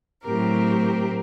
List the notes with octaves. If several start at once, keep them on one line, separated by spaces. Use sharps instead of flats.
A2 F#3 C4 G4 A#4